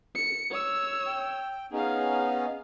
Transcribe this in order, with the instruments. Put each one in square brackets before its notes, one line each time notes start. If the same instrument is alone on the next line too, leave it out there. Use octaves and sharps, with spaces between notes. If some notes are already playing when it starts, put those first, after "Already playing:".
[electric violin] C#7
C#5 E6
[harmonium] G5
[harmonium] B3 C#4 D#4 [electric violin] G#4 F5